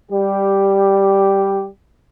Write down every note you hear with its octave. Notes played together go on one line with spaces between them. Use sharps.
G3 G4